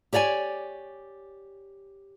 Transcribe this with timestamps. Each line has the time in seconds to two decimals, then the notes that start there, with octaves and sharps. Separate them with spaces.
0.13 G4 C#5 D5 F#5 G#5